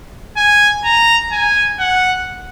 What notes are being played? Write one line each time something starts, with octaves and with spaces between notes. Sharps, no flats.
G#5
A#5
G#5
F#5